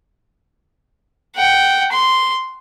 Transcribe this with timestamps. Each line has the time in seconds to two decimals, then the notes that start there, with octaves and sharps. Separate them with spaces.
1.36 F#5 G5
1.92 C6